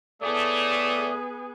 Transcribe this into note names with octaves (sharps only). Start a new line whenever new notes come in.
A2 A3 B3 G#4 D5 D#6